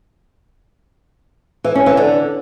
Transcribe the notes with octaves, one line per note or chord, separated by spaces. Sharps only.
E3
C#4
E3
D3